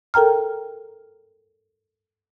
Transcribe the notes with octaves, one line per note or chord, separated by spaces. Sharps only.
A4 A#4 G5 A#5 F6